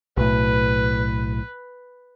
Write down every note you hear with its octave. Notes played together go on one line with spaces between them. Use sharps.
B1 A2 B4